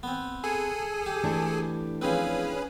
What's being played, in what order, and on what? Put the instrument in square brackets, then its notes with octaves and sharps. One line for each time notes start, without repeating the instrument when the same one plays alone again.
[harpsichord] B3 C4
[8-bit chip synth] G#4 A4 G#5
[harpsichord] G4
[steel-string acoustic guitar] E3 A3 D4
[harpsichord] F3 C4 [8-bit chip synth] C#4 G#4 B4